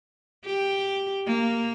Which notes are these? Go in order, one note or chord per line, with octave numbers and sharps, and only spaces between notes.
G4
A#3